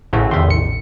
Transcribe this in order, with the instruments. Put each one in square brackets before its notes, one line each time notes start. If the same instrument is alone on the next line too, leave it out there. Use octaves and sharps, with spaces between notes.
[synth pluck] A1 A2 C#3 [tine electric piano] E3 F#4
[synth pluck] E2 C3 D#3 [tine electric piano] E5 C6
[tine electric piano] A1 C#7